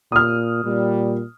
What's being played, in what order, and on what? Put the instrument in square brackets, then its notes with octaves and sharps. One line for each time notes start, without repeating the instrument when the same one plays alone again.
[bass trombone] A#2 [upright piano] D#6 F6
[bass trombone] A#2 [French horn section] G3